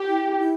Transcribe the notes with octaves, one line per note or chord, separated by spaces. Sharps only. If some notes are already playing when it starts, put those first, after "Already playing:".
Already playing: G4
E4
E4